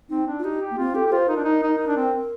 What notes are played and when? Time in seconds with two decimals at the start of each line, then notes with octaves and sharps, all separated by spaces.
0.10 C4 D#4
0.27 D4
0.39 F4
0.44 D#4 G4
0.61 G4
0.71 A#3
0.78 C4 F4
0.94 G4 A4
1.06 G4
1.12 F4 C5
1.29 D#4 A#4
1.36 D4
1.44 D#4
1.63 D#4
1.78 D#4
1.87 D4
1.96 C4